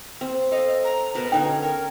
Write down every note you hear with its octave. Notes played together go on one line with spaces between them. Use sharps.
C4
A4 D#5 F5
A#5
B2 A#4 B4 A5
D3 C#4 D#4 G5
A#4 C#5